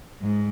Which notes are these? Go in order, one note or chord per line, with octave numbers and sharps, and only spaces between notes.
G#2